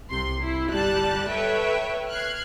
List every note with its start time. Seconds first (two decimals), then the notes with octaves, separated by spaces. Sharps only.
0.10 C2 C3 C6
0.40 E4
0.70 G1 G3 A5 F#6
1.30 A4 B4 C#5 E5 G5
2.09 F6 F#6 G#6 C7